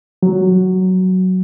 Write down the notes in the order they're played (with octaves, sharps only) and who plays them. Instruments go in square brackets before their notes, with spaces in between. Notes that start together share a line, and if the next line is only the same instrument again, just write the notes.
[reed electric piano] F#3